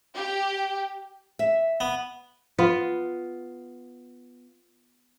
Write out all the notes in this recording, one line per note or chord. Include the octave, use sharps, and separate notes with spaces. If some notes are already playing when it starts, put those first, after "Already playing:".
G4
E5
B3
B3 F4